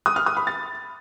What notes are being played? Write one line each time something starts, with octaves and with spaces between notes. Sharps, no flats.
D#6
F6
D#6
B5
A6